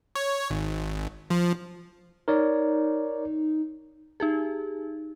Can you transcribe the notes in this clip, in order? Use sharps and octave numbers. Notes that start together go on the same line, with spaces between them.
C#5
G#1
F3
D#4 A#4 C#5 D5
D#4 G4 G#4